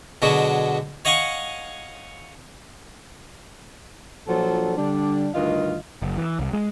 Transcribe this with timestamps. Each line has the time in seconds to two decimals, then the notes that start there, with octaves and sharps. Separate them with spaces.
0.22 B2 D3 F#3 G#3 F#4
1.05 C#5 D#5 F5 F#5 G#5 C#6
4.28 A#2 F3 F#3 D4 A4
4.77 D3 G3 D4
5.34 D2 G2 D#3 F4 D#5 F5
6.02 F#1
6.18 E3
6.39 C2
6.53 G#3